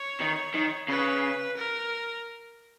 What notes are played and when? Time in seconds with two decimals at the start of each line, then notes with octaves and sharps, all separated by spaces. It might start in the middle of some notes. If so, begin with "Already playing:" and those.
Already playing: C#5
0.21 D#3
0.55 D#3
0.88 C#3 B4
1.57 A#4